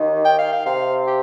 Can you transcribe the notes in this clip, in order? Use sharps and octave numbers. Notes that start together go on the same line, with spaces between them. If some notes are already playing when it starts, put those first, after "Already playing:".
Already playing: D#2 D#3
G5
F5
F5
C3 F5
G4